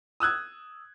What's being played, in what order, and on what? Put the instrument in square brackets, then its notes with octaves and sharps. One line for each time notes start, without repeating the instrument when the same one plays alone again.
[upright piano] D#6 E6 F#6 G#6